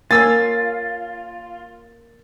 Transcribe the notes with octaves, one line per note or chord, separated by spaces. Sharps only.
A#3 C#4 F4 G#5 E6 A6